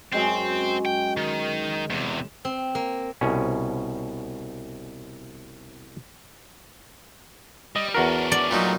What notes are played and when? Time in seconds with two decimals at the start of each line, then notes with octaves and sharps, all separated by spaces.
0.12 F#2 G#3 C4 C#6
0.85 G5
1.17 D#3
1.90 E2 C3
2.45 C4
2.75 A#3
3.21 C2 B2 C#4
7.76 G3 D#5
7.94 E2 C#4 D4 F#4 A#4
8.32 D5
8.51 A#2 F#3 G3 A3 D#4